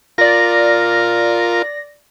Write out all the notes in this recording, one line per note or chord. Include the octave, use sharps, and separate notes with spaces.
F4 A#4 D5 A#6